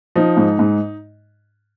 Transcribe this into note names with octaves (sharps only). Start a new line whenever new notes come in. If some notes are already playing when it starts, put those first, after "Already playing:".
F3 D#4
G#2
G#2